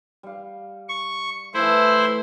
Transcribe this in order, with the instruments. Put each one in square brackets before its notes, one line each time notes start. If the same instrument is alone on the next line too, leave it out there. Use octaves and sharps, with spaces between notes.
[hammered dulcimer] G3 F5
[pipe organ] C#6
[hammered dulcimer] E3 A3 [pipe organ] E4 C5